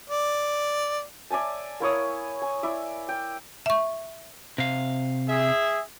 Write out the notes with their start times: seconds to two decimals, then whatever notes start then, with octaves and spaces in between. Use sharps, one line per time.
0.10 D5
1.31 D5 E5 G#5 A5
1.80 A#3 E4 C#5 D#6
2.42 G#5
2.63 E4 D5 E5
3.09 G5
3.66 E5 C#6
4.58 C3 F5
5.28 G#4 E5